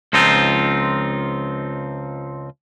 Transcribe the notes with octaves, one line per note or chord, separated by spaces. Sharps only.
C#2 F3 C4 D#4 F4